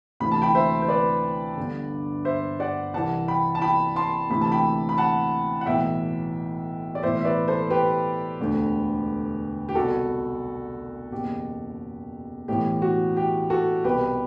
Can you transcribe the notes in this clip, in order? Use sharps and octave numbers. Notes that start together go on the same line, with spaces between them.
D2 C3 E3 B5
A5
G5 B5
C5 E5
C5
B4 D5
G1 G2 D3
C5 E5
D5 F#5
C2 C3 E3 F#5 A5
G5 B5
A5
G5 B5
A5 C6
D2 C3 E3 B5
A5
G5 B5
B5
F#5 A5
F#5
B1 A2 E3 E5 G5
D5
B1 A2 E3 C5 E5
E5
B4 D5
A4 C5
G4 B4
E1 D2 D3
G4
C2 B2 F#4 A4
F#1 E2 B2 G4
B1 A2 E3 G4
F#4
G4
F#4 A4
C2 B2 G4 B4